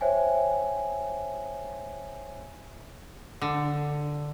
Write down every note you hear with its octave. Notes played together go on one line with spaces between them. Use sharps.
C5 C#5 E5 G5 G#5
D3